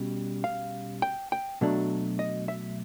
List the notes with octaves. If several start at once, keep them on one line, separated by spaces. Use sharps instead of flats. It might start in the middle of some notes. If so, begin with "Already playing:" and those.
Already playing: B2 G3 C#4
F5
G5
G5
B2 F#3 A3 D4
D#5
E5